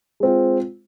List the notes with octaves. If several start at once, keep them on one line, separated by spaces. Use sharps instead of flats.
G#3 C4 F4